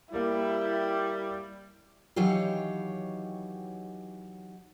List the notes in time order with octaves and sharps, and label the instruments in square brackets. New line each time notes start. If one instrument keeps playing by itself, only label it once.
[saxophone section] G3 [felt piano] A#3 A#4 [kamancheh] E4
[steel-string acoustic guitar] D#3 E3 F#3 G4 C#5 F5